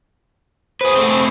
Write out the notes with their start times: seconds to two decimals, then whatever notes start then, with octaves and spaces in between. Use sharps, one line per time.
0.81 G#4 B4 C5
0.95 A3 C4